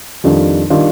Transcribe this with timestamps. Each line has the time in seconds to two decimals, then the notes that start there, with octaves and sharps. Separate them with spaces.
0.24 F2 D#3 G3 D4 F4
0.70 D#3 G3 D4 F4